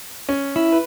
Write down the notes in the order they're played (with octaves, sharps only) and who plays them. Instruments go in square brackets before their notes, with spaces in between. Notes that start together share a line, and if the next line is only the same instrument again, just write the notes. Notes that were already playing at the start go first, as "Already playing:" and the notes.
[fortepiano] C#4
[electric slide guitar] E4
[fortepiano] B4